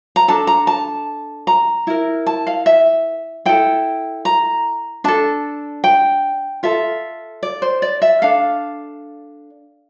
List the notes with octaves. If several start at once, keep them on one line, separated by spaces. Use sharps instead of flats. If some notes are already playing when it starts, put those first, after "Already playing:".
A#5
D4 A4 A5
A#5
A5
A#5
E4 A#4
A5
F5
E5
E4 A4 G5
A#5
D4 A4 A5
G5
F4 A4 E5
D5
C5
D5
E5
D4 A4 F5